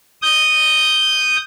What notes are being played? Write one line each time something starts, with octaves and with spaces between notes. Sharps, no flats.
D#6 G6